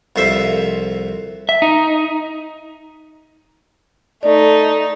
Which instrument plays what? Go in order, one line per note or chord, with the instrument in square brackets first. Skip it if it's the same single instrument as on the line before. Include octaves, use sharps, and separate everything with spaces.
[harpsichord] C2 F2 C5 E5
[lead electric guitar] E5
D#4
[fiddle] A3 D#4 [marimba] D5